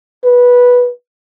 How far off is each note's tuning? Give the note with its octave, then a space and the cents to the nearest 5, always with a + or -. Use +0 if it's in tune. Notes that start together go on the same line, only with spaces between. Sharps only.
B4 -10